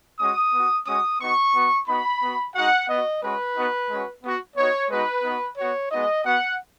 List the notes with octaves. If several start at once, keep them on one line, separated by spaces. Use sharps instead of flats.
G#3 C#4 F#4 D#6
B3 F#4
G#3 C#4 F#4 D#6
B3 D#4 F#4 C#6
B3 F#4
B3 D#4 F#4 B5
B3 F#4
G#3 D#4 F#4 F#5
B3 F#4 D#5
G#3 C#4 F#4 B4
B3 D#4 F#4
G#3 C#4 F#4
B3 F#4
B3 D#4 F#4 C#5
G#3 B3 D#4 F#4 B4
B3 D#4 F#4
B3 F#4 C#5
G#3 B3 D#4 F#4 D#5
B3 F#4 F#5